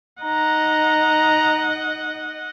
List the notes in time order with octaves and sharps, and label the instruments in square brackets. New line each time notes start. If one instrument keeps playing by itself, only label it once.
[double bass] D#4 [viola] D#5 F#5 [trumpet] A#5